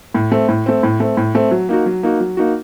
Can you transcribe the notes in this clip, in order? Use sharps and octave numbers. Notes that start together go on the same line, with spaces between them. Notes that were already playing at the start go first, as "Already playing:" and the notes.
A2
A3 C4
A2
A3 C4
A2
A3 C4
A2
A3 C4
F#3
A#3 D#4 F#4
F#3
A#3 D#4 F#4
F#3
A#3 D#4 F#4